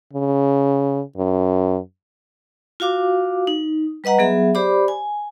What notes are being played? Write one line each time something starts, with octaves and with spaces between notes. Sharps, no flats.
C#3
F#2
F4 F#4 F5 D6
D#4
G3 B4 D#5 F#5 A#5
F#3 B3 G#4 E5
G4 C5 D5 B5 D6
G#5